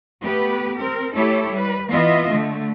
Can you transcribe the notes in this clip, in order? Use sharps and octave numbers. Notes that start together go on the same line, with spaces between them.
A3 B3 G4 B4
C4 A#4
A3 E4 G4 A4 C#5
G3 B4
E3 B3 F4 D#5 E5
D3 A3